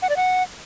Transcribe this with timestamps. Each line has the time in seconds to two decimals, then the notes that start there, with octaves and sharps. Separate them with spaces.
0.02 F#5
0.09 D5
0.17 F#5